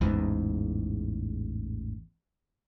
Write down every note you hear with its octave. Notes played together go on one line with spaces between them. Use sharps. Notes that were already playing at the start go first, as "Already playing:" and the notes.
A1 E2 G#2